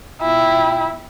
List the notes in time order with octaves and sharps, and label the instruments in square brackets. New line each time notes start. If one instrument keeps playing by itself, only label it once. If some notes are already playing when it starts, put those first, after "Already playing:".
[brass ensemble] B2 F4 G5 [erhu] E4